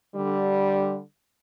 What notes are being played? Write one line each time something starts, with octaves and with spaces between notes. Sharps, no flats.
D3 G3